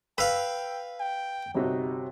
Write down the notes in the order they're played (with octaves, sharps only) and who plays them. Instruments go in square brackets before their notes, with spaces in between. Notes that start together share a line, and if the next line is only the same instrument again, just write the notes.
[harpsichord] B4 F5 [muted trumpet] G5 [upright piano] E6
[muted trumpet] G5
[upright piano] G1 C3 F#4 [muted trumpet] D#4